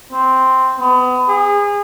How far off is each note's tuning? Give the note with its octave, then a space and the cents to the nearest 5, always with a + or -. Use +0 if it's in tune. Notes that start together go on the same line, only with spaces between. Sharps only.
C4 -5
B3 +30
G#4 -30